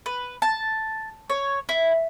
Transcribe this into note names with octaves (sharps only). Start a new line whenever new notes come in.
B4
A5
C#5
E4